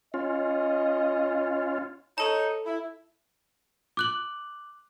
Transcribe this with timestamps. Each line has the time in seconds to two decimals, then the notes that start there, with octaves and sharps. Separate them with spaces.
0.14 C#4 F4 D#5
2.18 D#4 A4 C#5 A5
2.66 E4
3.97 D6 F#6 F#7